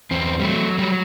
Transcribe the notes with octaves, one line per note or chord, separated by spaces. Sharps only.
E2 C4
G3
F#3 A3
F#3 G3